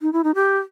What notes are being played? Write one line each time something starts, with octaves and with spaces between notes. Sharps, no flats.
D#4
E4
D#4
G4